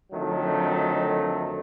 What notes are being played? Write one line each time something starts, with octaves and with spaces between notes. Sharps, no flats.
F2 D3 D#3 F#3 A3